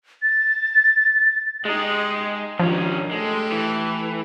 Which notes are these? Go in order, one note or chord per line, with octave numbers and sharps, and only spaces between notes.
A6
G#3 D#4 G4
G#2 D#3 F3 C#4 D4
G#3 A3 G4 A4
E3